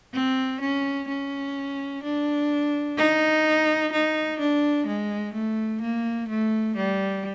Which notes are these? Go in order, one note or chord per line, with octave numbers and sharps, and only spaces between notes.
C4
C#4
C#4
D4
D#4
D#4
D4
G#3
A3
A#3
A3
G3